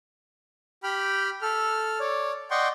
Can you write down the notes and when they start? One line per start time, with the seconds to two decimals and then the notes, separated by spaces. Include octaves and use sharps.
0.83 G4 G5 B5 F6
1.42 A4 F6
2.00 C#5 D5
2.51 D5 D#5 F#5 G5 C6 C#6